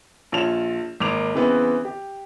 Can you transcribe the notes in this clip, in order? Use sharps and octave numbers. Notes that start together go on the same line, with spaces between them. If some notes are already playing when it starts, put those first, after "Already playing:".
A#1 F4 C#5 A5 E7 F7
G#1 A#3 D6 F7
C#3 E3 B3 C4
G4